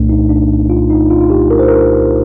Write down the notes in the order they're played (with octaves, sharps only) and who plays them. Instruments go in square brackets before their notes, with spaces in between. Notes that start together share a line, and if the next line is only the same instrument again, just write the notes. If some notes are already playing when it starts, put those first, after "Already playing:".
Already playing: [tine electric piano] C2 A#2 A3 D4
D#4
D4
F4
D#4
F4
F4
G4
A#4
C5
A#4